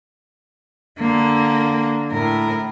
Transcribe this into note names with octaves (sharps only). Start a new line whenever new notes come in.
D3 A#3
A2 A#4